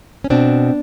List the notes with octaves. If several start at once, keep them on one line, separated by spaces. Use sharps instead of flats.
C#4
B2 C4 D4